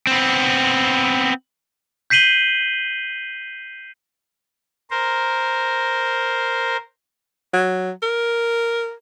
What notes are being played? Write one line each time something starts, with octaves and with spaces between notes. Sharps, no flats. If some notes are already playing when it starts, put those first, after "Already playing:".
B3 C4
G6 B6 C7 D#7 F#7 G7
A#4 C5
F#3
A#4